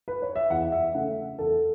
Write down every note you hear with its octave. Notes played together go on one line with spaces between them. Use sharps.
B4
C#5
E5
E2 F#5
E5
C#3 A3 C#4 F#5
E2 A4